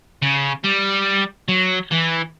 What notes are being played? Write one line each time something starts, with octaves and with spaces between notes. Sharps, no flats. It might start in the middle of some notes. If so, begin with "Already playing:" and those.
C#3
G3
F#3
E3